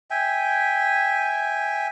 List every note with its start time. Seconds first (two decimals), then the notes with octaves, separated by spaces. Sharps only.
0.11 E5 G5 G#5